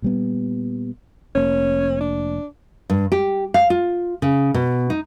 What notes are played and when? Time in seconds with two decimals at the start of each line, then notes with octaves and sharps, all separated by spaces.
0.02 A#2 G3 B3
1.35 F1 A#3 C#4
2.01 D4
2.90 G2
3.12 G4
3.54 F5
3.70 F4
4.22 C#3
4.54 B2
4.90 D#4